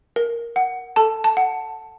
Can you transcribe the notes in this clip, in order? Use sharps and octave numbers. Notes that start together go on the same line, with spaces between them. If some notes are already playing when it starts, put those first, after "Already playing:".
A#4
F#5
A4 A5
A5
F#5